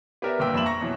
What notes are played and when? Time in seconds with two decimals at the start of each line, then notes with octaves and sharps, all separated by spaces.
0.22 B3 G4 A#4 D5 E5
0.39 G1 A#2 B4 G5 E6
0.54 F2 A#2 E5 B5 E7 F#7
0.66 A#5 C#6 A#6
0.81 B2 E3 F#3